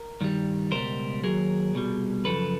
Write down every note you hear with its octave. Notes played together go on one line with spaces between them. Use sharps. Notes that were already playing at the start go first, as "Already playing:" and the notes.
Already playing: A#4
G2 D#3 G3
C#2 B2 G3 A#4 C5
D#2 C#3 F#3 G#4 A#4
C2 B2 G3
F#2 C#3 F3 A4 B4